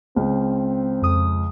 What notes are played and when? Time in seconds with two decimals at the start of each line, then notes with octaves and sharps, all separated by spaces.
0.16 C#2 C4
1.02 F2 D#6